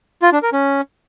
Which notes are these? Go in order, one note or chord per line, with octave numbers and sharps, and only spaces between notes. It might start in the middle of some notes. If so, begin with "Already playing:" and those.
F4
D4
A#4
C#4